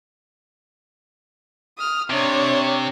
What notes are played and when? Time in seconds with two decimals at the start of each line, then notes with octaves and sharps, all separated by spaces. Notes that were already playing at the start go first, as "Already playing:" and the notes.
1.77 D#6 F6
2.10 C3 D4 C#5